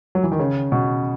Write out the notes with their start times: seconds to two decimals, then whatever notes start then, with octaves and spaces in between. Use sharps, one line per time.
0.15 F#3
0.24 E3
0.32 D#3
0.39 C#3
0.72 B2